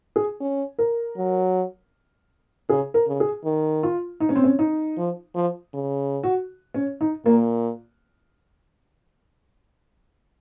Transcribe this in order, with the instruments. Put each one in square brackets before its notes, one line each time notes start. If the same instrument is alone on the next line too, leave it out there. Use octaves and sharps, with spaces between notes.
[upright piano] G#4
[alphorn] C#4
[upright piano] A#4
[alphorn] F#3
[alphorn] C#3 [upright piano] G#4
[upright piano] A#4
[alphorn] C#3
[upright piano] G#4
[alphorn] D#3
[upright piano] F4
D#4
C#4
C4
C#4
D#4
[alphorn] F3
F3
C#3
[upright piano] F#4
C#4
D#4
[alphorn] A#2 [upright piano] A#3